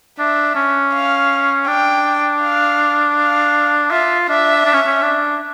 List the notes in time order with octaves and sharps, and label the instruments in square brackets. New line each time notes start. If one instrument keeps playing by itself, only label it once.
[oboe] D4 [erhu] E5
[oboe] C#4
[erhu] F5
[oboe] D4 [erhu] G5
[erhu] F5
F5
[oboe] F4 [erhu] E5
[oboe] D4 [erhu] E5
[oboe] D4
C#4
C#4
D4